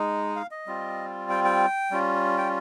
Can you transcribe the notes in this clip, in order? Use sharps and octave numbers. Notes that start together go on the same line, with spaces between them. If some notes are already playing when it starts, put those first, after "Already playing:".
Already playing: G#3 D#4
F5
D#5
G3 C4 F4
G5
G5
G3 C#4 F4
G5